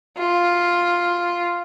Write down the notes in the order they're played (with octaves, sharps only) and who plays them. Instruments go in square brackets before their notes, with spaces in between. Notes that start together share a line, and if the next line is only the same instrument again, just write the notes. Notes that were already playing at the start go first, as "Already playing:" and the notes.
[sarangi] F4